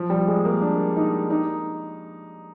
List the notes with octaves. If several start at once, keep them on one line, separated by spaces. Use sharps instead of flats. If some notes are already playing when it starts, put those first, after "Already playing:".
Already playing: F3
G3
G#3
A#3
D4
D#4
D#4